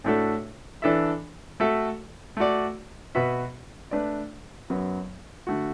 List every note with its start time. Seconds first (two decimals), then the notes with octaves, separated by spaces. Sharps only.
0.04 A2 A3 D4 F#4 A4
0.82 E3 D4 A4 E5
1.60 A3 F#4 A4 E5
2.37 A3 F#4 D5
3.15 B2 B3 F#4 B4 E5
3.91 A3 D4 B4 D5
4.70 F#2 F#3 B3
5.47 D3 A3 F#4